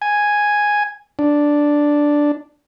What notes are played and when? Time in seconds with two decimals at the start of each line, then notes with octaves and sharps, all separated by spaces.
0.02 G#5
1.19 D4